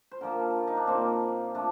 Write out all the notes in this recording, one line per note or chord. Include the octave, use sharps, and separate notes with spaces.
C5
D3 F3 A#3 A#4
F4
D#4
D4
A#2 F3 A#3 C4
F3 A3 D4